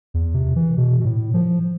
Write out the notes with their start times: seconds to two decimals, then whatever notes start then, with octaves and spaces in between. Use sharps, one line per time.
0.14 E2
0.35 C3
0.56 E3
0.77 B2
1.00 B2
1.05 A2
1.34 F3